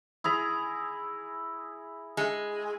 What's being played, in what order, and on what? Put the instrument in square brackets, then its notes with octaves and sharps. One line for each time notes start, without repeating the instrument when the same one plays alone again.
[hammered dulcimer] E4 G#4 A#5
[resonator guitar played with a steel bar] G#3